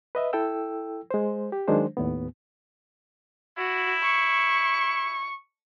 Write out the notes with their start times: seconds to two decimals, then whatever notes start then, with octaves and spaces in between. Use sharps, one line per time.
0.15 B4 D#5 E5
0.33 E4 A4 G5 E6
1.11 G#3 C5
1.52 G4
1.68 D#3 F#3 G#3 D4 C5
1.97 D#2 A2 B3
3.58 E4 F#4
4.03 C#6